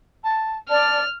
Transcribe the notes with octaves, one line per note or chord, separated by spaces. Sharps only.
A5
D5 A5 F6